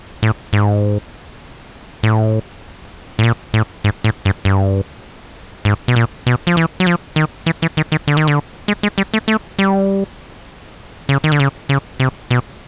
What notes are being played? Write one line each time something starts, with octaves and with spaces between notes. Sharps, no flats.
A2
G#2
A2
A2
A#2
A2
G#2
A2
G2
G2
G#2
B2
A#2
B2
F3
E3
F#3
F3
D#3
E3
E3
D#3
D#3
D3
D#3
D3
G#3
G#3
G3
A3
A3
G3
C#3
D#3
D3
C#3
C#3
C3
B2